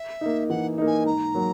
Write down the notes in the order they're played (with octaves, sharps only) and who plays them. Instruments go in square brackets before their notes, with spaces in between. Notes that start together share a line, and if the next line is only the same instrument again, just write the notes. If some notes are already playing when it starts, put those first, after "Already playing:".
Already playing: [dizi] E5
[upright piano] A#3 D#4
[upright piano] E3 [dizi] F#5
[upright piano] A#3 D#4
[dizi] G#5
[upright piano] G#2 [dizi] A#5
[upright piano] F#3 A#3